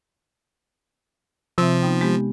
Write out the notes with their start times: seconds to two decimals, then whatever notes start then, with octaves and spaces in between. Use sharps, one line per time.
1.58 C3 F3 C4 E5
1.82 B3 D#4 G5
2.01 G#3 B3 G4